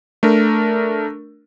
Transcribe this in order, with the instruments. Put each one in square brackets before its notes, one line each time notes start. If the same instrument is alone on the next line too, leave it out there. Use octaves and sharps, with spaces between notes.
[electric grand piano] A3 D4 A#4